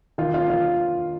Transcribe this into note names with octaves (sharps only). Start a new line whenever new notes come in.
D#3 F4
A#3 C#4 F4
D#3 F4